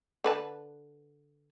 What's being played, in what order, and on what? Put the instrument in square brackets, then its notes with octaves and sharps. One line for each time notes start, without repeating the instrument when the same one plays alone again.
[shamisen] D3 B4 A5